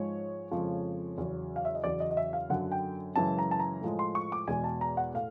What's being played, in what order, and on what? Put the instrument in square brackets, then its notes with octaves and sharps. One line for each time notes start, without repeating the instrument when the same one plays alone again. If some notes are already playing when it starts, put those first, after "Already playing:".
Already playing: [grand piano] G#2 F3 G#3 C#5
F2 C#3 F3 G#3
E2 C#3 F#3
F5
E5
D#5
E2 C#3 F#3 D5
D#5
D#5
E5
F5
F#2 D3 F#3 F#5
G5
F#2 C#3 E3 G#3 A5
A#5
A5
A#5
A2 F3 G#3
C6
C#6
D6
E2 B2 G#3 G#5
A5
A#5
F#5
A2 F5